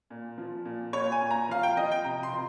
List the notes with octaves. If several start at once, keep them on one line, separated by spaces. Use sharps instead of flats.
A#2
F3
A#2
A#2 C#5
G#5
A#2
A#5
F3 F5
G5
F3 D#5
G5
C3 A#5
C6
F3